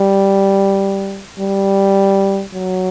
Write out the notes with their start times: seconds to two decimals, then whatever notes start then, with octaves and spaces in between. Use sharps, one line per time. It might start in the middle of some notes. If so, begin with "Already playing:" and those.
Already playing: G3
1.39 G3
2.54 F#3